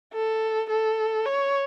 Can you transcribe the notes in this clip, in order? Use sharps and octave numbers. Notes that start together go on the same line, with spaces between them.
A4
A4
C#5